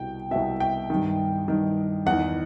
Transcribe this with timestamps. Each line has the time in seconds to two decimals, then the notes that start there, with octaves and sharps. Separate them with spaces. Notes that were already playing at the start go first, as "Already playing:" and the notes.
Already playing: C2 B2 G5
0.31 C2 B2 E5
0.60 G5
0.90 G2 D#3
1.48 G2 D#3
2.06 E2 D#3 F#5